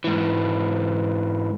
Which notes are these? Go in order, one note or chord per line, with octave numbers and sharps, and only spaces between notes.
G#2 E3